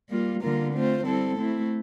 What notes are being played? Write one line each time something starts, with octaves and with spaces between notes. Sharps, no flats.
G3 A#3 F4
D3 G3 A#3 F4 A#4
A3 C4 F4 C5
G3 C4 E4 A4
A3 C4 E4